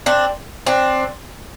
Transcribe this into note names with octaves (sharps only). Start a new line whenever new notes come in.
C4 D4
C4 D4